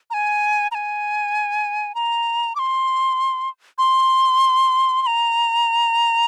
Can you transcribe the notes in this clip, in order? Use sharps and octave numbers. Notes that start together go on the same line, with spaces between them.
A#5
G#5
A#5
G#5
A#5
D6
C6
C6
C6
A#5